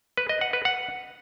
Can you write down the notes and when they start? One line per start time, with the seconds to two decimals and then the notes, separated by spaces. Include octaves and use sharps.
0.18 B4
0.29 D#5
0.41 F#5
0.53 B4
0.65 F#5